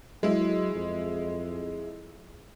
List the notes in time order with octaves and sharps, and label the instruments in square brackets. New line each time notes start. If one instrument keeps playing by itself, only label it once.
[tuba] F#3 [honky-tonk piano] G#3 E4
[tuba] F2